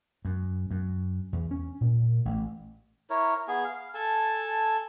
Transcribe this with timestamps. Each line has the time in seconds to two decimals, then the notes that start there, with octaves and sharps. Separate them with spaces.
0.25 F#2
0.71 F#2
1.33 E2
1.51 C#4
1.81 A#2
2.25 A1
3.10 E4 A#4 C#5
3.48 B3 G#4 G#5
3.65 F5
3.94 A4 G#5 A5